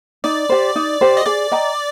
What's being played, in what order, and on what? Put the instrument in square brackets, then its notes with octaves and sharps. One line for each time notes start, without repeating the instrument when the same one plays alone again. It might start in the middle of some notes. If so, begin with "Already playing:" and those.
[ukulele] D#4 [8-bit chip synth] D5
[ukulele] G4 C5
D#4
G4 C5
[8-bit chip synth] D#5
[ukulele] G#4 [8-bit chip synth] D5
[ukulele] D#5 G5 A#5